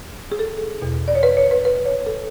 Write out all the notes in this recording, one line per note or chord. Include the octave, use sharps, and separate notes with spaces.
G#4
A4
E2 B2
D5
C#5
B4
C#5
B4
B4
C#5
A4